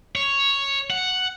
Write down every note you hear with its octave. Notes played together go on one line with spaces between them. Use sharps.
C#5
F#5